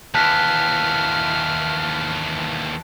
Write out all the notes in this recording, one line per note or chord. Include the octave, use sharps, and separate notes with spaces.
D#2 E3 A5 F6 F#6 B6